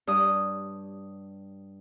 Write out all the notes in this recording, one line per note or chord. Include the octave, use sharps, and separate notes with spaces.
G2 D#6